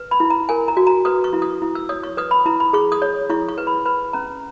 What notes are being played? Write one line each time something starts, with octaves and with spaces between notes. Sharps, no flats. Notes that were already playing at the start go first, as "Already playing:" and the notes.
Already playing: B4
B5
E4
A#5
A#4 G#5
A#5
F#4
A#5
B4 D#6
C#6
E4
D#6
E4
E6
C#5 D#6
C#6
B4 D#6
B5
E4 A#5
B5
G#4 C#6
D#6
C#5
E4 C#6
C#6
B4
B5
B4 B5
C#4 A#5